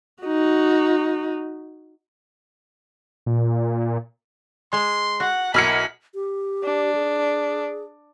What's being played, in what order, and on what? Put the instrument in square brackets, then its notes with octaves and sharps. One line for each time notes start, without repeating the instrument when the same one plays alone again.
[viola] D#4 F#4
[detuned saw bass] A#2
[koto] G#3 [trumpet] C6
[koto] F#4 [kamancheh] F#5
[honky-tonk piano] B1 F6 C#7 [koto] E4 G#5 [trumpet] A#4 [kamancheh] B5
[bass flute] G4
[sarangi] D4
[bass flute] G#4